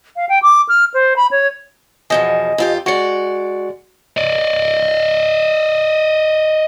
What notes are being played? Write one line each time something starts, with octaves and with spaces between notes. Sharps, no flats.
F5
G5
D6
F6
C5
B5
C#5
E2 B2 F3 D#5 G#5
F2 F4 G4
G#3 F#4 D5 C#7
D5 D#5